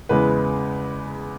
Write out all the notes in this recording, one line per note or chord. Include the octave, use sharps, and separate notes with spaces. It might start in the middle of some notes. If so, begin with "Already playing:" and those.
E2 C#3 G#3 B4